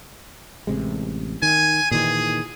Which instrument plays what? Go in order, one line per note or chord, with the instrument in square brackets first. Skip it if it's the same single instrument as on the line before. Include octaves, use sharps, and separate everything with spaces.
[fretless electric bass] A1 C3 G#3
[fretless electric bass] D#3 [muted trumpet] G#5
[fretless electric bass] A#2 D#3 E3 [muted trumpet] G#4